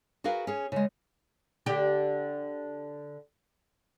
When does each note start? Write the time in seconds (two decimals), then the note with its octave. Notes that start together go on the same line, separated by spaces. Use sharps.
0.24 F#4 G#4 A#4 B4 F5
0.47 C#4 G#4
0.72 C#3 G#3
1.66 D3 G4